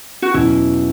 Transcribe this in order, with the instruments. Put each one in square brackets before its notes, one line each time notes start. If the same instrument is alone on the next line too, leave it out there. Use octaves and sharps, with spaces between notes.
[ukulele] F#4
[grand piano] E2 B2 F#3 C#4 [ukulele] E4